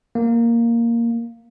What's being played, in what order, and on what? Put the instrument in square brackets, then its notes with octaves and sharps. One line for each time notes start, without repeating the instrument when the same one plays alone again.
[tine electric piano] A#3